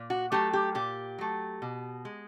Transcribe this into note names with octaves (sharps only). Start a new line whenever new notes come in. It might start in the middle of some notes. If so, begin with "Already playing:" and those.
Already playing: A#2
F#4
F#3 A3 G4
G4
A#2 G4
F#3 A3
B2
G#3